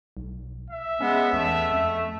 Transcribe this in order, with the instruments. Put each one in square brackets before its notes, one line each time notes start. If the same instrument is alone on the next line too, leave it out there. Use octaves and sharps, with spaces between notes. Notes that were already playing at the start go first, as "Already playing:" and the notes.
[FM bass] B1
[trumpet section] E5
[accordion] G#3 B3 [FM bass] C#4
[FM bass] E2 [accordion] A3
[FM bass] F2